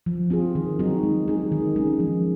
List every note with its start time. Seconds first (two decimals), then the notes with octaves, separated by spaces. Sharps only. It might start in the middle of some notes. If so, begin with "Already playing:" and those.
0.06 F3
0.30 C4 F4 G#4
0.55 D#3
0.79 F#3 C4 D#4 F#4
1.03 G#3
1.28 D#4 G#4
1.52 D#3
1.76 G#3 C#4 G#4
2.00 F3